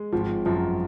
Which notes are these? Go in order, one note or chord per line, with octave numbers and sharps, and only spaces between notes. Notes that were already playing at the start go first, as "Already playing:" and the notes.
Already playing: G#3
G#1 F3
F#2 F3